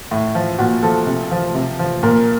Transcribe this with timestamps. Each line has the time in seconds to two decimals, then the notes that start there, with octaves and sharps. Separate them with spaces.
0.11 A2
0.35 F3
0.59 A#2 F#4
0.83 F3 A4
1.07 C3
1.31 F3
1.55 C3
1.79 F3
2.03 A#2 A#4